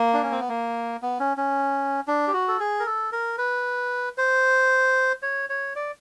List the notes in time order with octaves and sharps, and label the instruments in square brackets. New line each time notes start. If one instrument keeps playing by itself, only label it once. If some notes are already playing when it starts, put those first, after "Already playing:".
Already playing: [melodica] A#3
D4
C#4
C4
B3
A#3
B3
C#4
C#4
D4
G4
F#4
A4
G#4
A#4
A4
A#4
B4
C5
C#5
C#5
D5